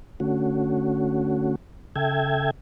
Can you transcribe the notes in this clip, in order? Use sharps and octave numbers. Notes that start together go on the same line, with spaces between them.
D3 A3 C#4 F#4
C#3 A4 E5 G5 G#6